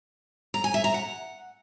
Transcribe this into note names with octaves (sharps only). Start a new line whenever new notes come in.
A#5
G#5
E5
A#5
F#5